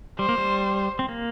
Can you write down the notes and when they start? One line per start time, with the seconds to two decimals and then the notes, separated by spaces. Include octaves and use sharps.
0.19 G3 C5
0.29 A#3
0.38 G3
0.99 C4
1.09 A#3